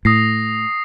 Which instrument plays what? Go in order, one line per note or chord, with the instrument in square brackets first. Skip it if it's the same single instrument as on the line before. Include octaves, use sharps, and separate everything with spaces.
[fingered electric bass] A2 [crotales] D#6 A#6 C7